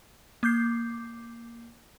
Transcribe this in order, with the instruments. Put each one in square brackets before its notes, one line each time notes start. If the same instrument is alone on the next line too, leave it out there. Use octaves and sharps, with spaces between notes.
[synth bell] A#3 D6 G6 C7